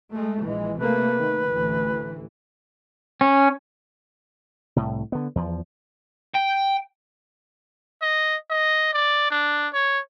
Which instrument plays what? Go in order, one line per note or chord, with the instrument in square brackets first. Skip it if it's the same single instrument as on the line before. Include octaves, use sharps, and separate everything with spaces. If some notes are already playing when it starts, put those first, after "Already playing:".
[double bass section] G#3 A3
[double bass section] A#1 E3 [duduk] G#3
[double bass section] C3 A3 A#3 [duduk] B4
[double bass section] D#3
A1 D2 E3
[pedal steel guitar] C#4
[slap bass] C2 A2
D3 B3
E2 F3
[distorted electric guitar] G5
[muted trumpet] D#5
D#5
D5
D4
C#5